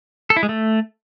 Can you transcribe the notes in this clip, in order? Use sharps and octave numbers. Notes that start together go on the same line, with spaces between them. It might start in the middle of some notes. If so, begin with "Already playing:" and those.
A4
E4
G#3
A3